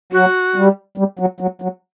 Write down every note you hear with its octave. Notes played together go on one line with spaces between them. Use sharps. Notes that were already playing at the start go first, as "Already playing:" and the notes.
F#3 F#4
G3
G3
F#3
F#3
F#3